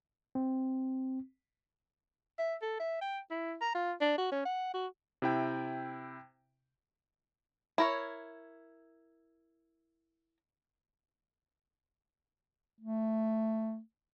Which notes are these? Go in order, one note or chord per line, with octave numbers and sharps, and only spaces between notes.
C4
E5
A4
E5
G5
E4
A#5
F4
D4
F#4
C#4
F#5
F#4
C3 E4 G5
E4 A#4 C#5
A3